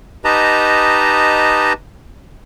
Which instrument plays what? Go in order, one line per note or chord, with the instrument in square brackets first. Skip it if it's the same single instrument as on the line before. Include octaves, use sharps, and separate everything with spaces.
[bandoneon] D#4 G4 B4 D#5 A5 A#5